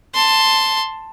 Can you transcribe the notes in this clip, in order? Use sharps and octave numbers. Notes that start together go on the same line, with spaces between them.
A5 C6